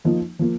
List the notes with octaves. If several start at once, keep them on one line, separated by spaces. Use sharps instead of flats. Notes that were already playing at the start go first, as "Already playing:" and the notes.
F3 A#3 D#4
F3 A#3